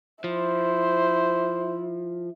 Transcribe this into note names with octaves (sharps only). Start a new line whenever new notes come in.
F3 E4 C5